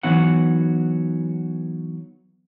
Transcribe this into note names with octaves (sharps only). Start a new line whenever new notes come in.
E3 F#3 B3 D#4 C#5 F#5